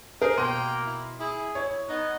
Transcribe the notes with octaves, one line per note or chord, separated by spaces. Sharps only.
G#4 A#4 C5
B2 A#3 G5 C6 D#7
E4
E4 G#4
E4 C#5
B3 D#4